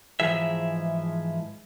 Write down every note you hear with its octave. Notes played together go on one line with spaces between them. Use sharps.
G#2 E3 F3 G#4 E5